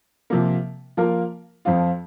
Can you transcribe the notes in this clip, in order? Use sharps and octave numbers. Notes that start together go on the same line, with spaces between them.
C3 F3 A#3
F3 A#3 F4 A#4
F2 F3 C4 F4